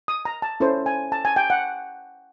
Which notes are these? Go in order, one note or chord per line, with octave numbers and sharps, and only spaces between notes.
D#6
A#5
A5
C#4 E4 A4 C5
G#5
A5
G#5
G5
F#5